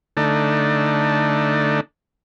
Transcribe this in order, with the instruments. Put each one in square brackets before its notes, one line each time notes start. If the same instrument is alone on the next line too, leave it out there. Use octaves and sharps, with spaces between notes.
[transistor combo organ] D3 A3 D4 D#4